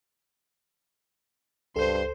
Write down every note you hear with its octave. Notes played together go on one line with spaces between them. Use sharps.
C#2 G2 A4 C5 C6